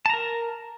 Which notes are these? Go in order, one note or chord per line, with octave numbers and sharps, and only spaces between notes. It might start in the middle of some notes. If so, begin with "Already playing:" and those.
A#4 A5 A#5